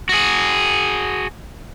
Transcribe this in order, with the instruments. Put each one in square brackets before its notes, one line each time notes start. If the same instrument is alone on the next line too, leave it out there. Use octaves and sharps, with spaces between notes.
[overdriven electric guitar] F#4 G#4